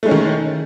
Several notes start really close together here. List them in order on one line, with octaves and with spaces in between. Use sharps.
A3 G#3 C#4 D#3